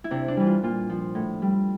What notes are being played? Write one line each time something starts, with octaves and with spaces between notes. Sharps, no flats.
E4
C3 D4
D4
E3 G3
F4
A#2 F4
F3
A2
G3